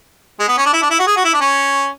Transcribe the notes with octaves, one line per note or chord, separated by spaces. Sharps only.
G#3
B3
C#4
D4
E4
D4
E4
F#4
G#4
F#4
E4
D4
C#4